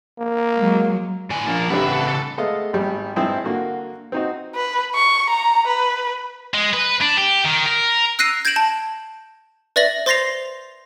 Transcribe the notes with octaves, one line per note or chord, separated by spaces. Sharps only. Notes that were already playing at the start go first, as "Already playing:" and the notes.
A#3
F#3 G#3
A2 D3 B4 G#5
F3 A#3 C#4 D4 A5
A1 G2 C#3 C4 B4 E5 F#5
A4
G#3 A3 B3 D#5 F5
G#1 G3
G#1 G2 C4 E4 C5 D#6
D3 A#3 F#4
C4 D#4 F#4
B4
C#6
A#5
B4
G#3
B4
D4
G4
D#3
A#4
E6 F#6 A#6 C7 D#7
G6 G#6 A#6 D7 E7 F#7
A5
B4 D5 E5 A6 A#6 F#7
C5 C6 A6 A#6 C7 F7